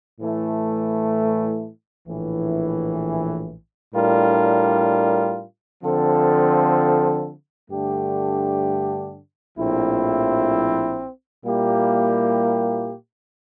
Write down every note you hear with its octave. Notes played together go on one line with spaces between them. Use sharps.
A2 E3 A3 E4
A#1 A2 E3
A2 G3 D4 F4 A#4
D3 F3 C4 F4 A4
G2 D3 A3 D4 G4
A#1 A2 F3 C4 E4
A#2 G3 A#3 E4 G4